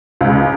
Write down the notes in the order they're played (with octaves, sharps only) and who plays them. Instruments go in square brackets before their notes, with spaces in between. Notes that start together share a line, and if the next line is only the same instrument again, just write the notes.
[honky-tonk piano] C#2